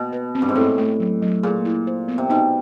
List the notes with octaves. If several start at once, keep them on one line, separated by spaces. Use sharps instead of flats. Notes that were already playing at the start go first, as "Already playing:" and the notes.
Already playing: B2
B4
C4
G2
G#2
A2 C4
A3
F#3
F#3
A#2 G#4
E4
C5
B3
C3
B2 D#4